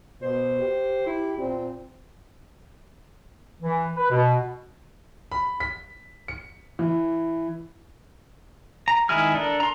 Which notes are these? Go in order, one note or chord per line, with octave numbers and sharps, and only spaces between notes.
B2 C5
G4
E4
A#2 C4
E3
B4
B2
B5
B6
C#7
E3
A#5
D#3 G#3 E4 G#4 F6
D4 A4 A#4
A#5 C6